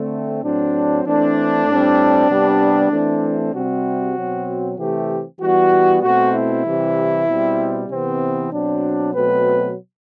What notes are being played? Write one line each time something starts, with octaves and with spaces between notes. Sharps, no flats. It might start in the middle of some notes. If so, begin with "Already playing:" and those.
Already playing: D3 A3 C4
A2 F#3 C4 D4
E3 A3 C4 D4
A2 G3 C4
C3 G3 B3
E3 A3 C4
C3 G3 C4 F#4
B2 F#3 C4
C3 E3 A3 C4 G4
E3 G3 B3 F#4
B2 A3 C4 F#4
E4
C3 E3 G3
B2 G3 C4
C3 E3 B3 C4
B2 F#3 C4 D4
B2 F#3 A3 C4 B4